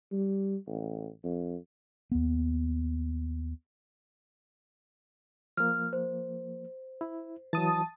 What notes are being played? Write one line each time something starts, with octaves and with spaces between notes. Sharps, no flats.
G3
A1
F2
D#2 B3
F3 A#3 F6
C5
E4
E3 F#3 A5 D#6